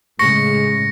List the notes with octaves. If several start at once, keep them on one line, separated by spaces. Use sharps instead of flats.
A2 C#3 G#3 C#6 A#6 C#7